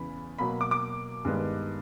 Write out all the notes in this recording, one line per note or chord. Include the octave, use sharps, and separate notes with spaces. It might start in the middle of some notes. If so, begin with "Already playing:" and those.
Already playing: E2 C#3 E3 B5
B2 F#3 A#3 B5
D6
D6
G2 D#3 G#3 B3